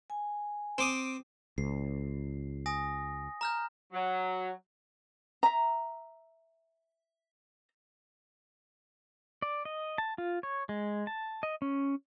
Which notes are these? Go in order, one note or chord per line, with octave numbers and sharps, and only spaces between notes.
G#5
C4 D6 D#6
C#2 C7
G#5 D#6 A#6
A#5 F6 G6
F#3
E5 A#5
D5
D#5
A5
F4
C#5
G#3
A5
D#5
C#4